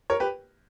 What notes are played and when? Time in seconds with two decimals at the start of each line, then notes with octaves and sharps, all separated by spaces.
0.10 A#4 C#5
0.20 G4 B4